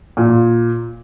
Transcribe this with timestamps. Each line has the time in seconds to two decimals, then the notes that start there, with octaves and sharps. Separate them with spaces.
0.17 A#2